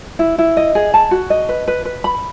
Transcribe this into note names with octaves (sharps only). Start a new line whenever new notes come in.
E4
E4
D#5
G#4
A5
F#4
D#5
B4
B4
B4
B5